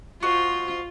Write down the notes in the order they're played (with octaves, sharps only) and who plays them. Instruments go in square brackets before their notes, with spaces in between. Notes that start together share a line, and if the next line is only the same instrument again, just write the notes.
[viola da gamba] F4 [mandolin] F#4 C5 D#5